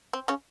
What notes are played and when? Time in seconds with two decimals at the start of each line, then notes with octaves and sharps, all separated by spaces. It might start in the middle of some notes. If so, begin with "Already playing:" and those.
0.13 C4
0.28 C#3 C#4